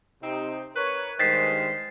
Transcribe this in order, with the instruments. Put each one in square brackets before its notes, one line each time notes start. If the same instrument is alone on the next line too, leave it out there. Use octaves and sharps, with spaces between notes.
[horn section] C3 C4 D#4
A#4 B4 C#5
[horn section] G2 D#3 G#3 [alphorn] C5 [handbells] A6 B6 C7